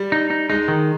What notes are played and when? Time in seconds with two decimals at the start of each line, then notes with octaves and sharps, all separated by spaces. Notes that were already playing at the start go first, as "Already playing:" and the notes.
Already playing: G3
0.12 D#4
0.30 D#4
0.50 G#3 D#4
0.68 D#3